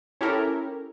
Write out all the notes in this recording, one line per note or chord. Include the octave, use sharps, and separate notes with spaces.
C#4 E4 G4 A4 A#4